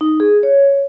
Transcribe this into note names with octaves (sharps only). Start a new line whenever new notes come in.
D#4
G#4
C#5